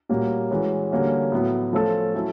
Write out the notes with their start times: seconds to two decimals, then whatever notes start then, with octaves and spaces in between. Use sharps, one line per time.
0.09 A#2 G3 A#3 C#4 F#4
0.50 E3 G#3 C#4 F#4 B4
0.91 D3 G3 A#3 C#4 F#4
1.32 A2 F#3 B3
1.73 F3 A3 C#4 F4 A4
2.14 F#3 A3 C#4 E4